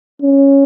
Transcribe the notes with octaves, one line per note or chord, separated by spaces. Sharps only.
C#4